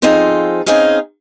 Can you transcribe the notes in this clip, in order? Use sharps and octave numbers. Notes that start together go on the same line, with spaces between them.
F3 C4 D#4 F4 G#4 A4
C4 C#4 D#4 G#4 D#5 F5